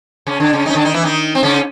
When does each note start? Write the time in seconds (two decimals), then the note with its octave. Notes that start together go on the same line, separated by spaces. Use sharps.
0.27 C#3 C#4
0.40 D3 D4
0.53 C#3 C#4
0.66 D#3 D#4
0.70 C#4
0.75 D3 D4
0.85 D#3 D#4
0.94 E3 E4
1.04 D#3 D#4
1.35 C4
1.43 C#3 C#4